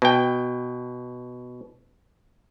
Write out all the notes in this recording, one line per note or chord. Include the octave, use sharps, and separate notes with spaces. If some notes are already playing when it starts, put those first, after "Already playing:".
B2 G5